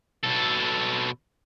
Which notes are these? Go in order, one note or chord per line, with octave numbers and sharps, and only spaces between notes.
B2 A4